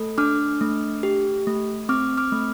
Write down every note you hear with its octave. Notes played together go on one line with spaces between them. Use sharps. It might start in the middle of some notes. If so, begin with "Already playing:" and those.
Already playing: A3 A4
D4 D6 F6
A3
G4
A3
C4 D6 F6
D6 F6
A3